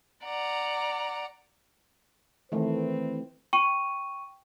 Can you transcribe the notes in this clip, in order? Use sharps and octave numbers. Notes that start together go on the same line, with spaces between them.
D5 F#5 A#5
D#3 E3 A3 C4 B4
G5 C#6 D#7